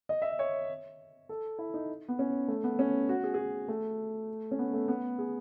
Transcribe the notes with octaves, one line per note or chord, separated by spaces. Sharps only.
D#5
E5
D#5
C#5
A4
E4
D#4
B3
C#4
A3
B3
C#4
F#4
G#4
G#4
F#4
A3
C#4
B3
A3
B3
G#4